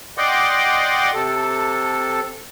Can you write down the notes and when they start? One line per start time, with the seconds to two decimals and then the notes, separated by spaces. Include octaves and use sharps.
0.18 D5 D#5 F#5 G5 C6 D6
1.14 C3 A4